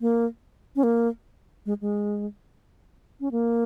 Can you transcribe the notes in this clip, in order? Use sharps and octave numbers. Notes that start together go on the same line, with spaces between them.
A#3
C#4
A#3
G#3
G#3
C#4
A#3